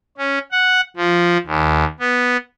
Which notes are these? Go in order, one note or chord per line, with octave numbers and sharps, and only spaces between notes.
C#4
F#5
F3
D#2
B3